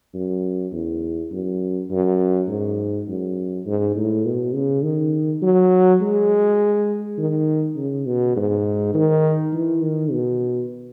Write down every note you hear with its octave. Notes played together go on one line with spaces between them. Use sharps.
F#2
E2
F#2
F#2
G#2
F#2
G#2
A2
B2
C#3
D#3
F#3
G#3
D#3
C#3
B2
G#2
D#3
E3
D#3
B2